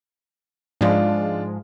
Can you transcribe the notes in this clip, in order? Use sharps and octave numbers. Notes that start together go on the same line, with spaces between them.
G#2 F3 G#3 D4 F4